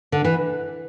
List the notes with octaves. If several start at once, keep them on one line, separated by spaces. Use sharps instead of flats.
D3
E3